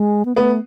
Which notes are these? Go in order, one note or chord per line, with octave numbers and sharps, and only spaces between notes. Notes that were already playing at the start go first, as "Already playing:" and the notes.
Already playing: G#3
B3
A3 B3